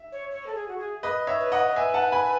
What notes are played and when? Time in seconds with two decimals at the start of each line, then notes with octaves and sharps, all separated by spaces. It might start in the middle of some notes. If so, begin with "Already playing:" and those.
Already playing: E5
0.12 C#5
0.31 C#5
0.46 A4
0.55 G#4
0.68 F#4
0.79 G#4
1.03 B4 D#5
1.27 C#5 E5
1.40 B4
1.52 D#5 F#5
1.76 B4 E5 G#5
1.94 F#5 A5
2.12 G#5 B5